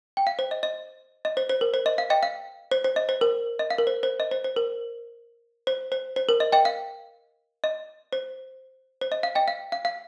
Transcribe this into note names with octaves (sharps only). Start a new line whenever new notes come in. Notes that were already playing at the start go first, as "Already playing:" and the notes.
G5
F5
C5
D#5
D#5
D#5
C5
C5
A#4
C5
D#5
F5
D#5 G5
F5
C5
C5
D#5
C5
A#4
D#5
F5
A#4
C5
C5
D#5
C5
C5
A#4
C5
C5
C5
A#4
D#5
D#5 G5
F5
D#5
C5
C5
D#5
F5
D#5 G5
F5
F5
F5